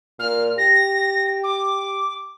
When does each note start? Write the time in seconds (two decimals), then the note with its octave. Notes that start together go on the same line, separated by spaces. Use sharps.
0.19 A#2 F6
0.58 G4 A#6
1.43 D6